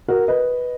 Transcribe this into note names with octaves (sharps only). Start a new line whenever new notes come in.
F#4 A#4
B4 D#5